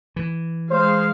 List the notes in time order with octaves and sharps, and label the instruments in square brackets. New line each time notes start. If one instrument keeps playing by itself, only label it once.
[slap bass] E3
[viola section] G#3 F5 [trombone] C5